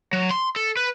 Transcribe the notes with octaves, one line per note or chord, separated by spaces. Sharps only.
F#3
C6
A4
B4